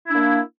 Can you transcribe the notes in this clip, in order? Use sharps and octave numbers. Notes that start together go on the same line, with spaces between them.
A#3 D4 E4